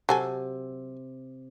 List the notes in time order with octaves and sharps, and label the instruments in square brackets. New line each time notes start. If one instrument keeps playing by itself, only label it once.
[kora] C3 [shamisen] F#3 A4 G#5